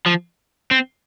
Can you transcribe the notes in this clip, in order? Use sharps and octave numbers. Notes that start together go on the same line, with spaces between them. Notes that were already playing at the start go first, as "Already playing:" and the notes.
F3
C4